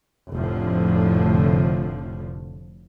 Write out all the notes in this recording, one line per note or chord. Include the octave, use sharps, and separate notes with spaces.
F1 A2 D3 F3